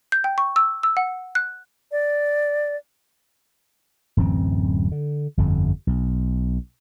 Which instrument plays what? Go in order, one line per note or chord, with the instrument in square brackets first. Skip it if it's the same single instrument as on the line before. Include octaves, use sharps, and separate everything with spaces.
[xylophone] G6
G5
C#6
E6
E6
F#5
F#6
[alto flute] D5
[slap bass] D1 F#2 E3 C4
D3
G1 F2 D3
B1